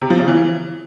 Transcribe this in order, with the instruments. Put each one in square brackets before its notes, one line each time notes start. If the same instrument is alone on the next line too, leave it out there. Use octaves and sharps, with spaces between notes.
[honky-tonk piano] C3
F3
C#3
E3